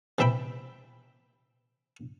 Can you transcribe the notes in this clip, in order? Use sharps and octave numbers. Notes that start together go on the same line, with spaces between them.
C3 E3 E5 G5 B5